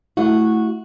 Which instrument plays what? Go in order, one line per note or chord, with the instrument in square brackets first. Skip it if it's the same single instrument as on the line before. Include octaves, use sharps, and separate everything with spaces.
[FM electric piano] A3 E4 [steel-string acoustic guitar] F#4